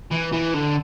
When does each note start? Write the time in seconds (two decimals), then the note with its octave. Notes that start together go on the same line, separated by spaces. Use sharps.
0.11 E3
0.32 E3
0.54 D3